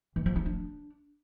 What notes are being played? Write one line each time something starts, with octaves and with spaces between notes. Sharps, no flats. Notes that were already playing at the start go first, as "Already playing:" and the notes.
E3
F3
F4
D4